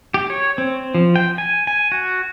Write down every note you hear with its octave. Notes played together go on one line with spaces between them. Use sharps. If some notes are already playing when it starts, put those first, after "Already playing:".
G4
C#5
C4
F3
G5
G#5
G#5
F#4